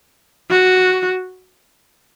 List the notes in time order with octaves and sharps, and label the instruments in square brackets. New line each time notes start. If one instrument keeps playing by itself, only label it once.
[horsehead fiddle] F#4